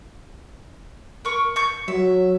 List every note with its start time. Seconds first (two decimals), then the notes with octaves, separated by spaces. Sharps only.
1.25 A#4 C#6
1.56 C#6 G6
1.88 F#3 E5